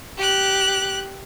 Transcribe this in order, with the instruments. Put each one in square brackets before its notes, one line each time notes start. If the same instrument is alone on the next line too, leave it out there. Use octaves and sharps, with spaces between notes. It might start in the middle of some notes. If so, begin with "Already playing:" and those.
[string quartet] G4 F#6